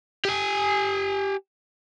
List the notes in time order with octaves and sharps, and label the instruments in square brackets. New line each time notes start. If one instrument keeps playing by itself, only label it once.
[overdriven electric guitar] G4 G#5